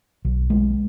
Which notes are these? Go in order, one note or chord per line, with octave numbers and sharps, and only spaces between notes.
B1
G#3